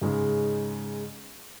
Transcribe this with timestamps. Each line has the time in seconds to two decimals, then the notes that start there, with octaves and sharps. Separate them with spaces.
0.01 G#2 C#3 G#3